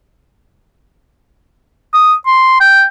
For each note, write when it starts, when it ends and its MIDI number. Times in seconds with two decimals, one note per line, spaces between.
1.94 2.14 87
2.26 2.57 84
2.61 2.84 79